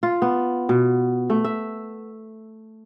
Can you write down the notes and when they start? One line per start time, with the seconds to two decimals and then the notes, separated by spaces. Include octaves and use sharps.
0.03 F4
0.22 B3
0.69 B2
1.30 A3
1.45 E5